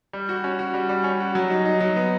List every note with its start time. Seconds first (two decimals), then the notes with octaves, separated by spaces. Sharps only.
0.13 G3
0.29 F#4
0.44 C#4
0.59 F#4
0.74 G3
0.89 G3
1.04 C#4
1.20 F#4
1.35 F#3
1.50 D#4
1.66 D#4
1.81 F#3
1.96 B3